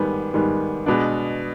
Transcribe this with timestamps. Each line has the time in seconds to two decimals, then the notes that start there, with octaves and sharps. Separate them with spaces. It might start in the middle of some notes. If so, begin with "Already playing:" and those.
Already playing: G#2 D#3 G3 B3
0.34 G#2 D#3 G3 B3
0.86 B2 G#3 B3 D4